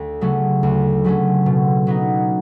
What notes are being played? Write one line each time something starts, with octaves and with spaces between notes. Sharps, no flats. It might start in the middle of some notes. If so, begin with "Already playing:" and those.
Already playing: D2
C#3 F#3 A3 C#4
D2
C#3 F#3 A3 C#4
B2
F#3 B3 D#4